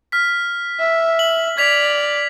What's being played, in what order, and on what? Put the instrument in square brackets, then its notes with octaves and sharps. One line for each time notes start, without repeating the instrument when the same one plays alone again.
[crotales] F6 B6
[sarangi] E5
[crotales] F#7
[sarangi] D5 [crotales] G#6 B6 F7